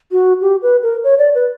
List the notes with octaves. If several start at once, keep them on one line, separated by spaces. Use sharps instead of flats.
F#4
G4
B4
A#4
C#5
D5
B4